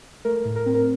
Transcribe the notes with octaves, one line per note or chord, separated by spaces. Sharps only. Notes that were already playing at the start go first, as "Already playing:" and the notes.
A3 A#4
A2
A#4
C4
A#4